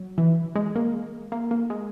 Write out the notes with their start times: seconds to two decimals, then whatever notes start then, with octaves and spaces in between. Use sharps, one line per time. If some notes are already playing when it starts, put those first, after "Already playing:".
Already playing: F#3
0.18 E3
0.56 G#3
0.76 A#3
1.32 A#3
1.51 A#3
1.70 G#3